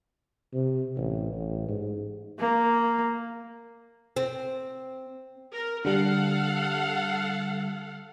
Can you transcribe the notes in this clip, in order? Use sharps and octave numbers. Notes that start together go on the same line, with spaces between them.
C3
A1
A1
G#2
A#3
C4
A#4
D3 G3 A4 F5 F#5